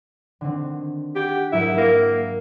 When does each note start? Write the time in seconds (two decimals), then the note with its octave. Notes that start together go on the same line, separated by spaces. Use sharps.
0.41 D3 D#3 C4
1.16 G4 F#5 G#6 B6
1.52 G#2 F#3 E4 A#4
1.78 A#3